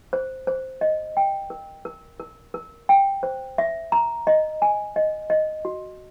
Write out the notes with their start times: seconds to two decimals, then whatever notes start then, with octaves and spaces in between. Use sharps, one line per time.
0.13 C5
0.47 C5
0.81 D#5
1.17 G5
1.50 A#4
1.85 A#4
2.20 A#4
2.54 A#4
2.89 G5
3.23 C5
3.58 E5
3.92 A#5
4.27 D#5
4.62 G#5
4.96 D#5
5.30 D#5
5.65 F#4